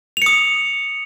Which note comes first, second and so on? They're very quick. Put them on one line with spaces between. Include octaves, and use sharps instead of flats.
F7 C#7 D#6